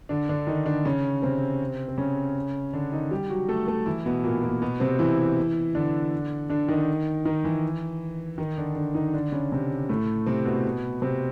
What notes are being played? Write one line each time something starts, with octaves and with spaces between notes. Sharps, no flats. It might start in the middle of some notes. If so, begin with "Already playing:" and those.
D3 D4
D3 D4
D#3 D#4
D3 D4
C#3 C#4
C3 C4
C4
C#3 C#4
D3 D4
D#3 D#4
G3 G4
F#3 F#4
A3 A4
A3 A4
E3 E4
B2 B3
A#2 A#3
A#2 A#3
B2 B3
C3 C4
E3 E4
D3 D4
D3 D4
D#3 D#4
D#3 D#4
E3 E4
D#3 D#4
D3 D4
D3 D4
D#3 D#4
D3 D4
C#3 C#4
C3 C4
A2 A3
C3 C4
B2 B3
C3 C4